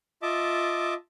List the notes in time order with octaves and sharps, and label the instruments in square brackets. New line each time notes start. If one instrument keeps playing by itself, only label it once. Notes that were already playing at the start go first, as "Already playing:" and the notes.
[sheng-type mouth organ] F4 D#5 E5 A5 D6